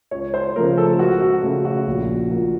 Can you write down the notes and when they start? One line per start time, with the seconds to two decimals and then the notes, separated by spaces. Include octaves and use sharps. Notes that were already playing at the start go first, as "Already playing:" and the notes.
0.11 C#2 C#5
0.34 C5
0.55 C#3 F3 A3 A#4
0.77 A4
0.99 C#2 F#4
1.21 F#4
1.43 C#3 A3
1.65 F#4
1.87 A#1
2.31 A#2 F3 A#3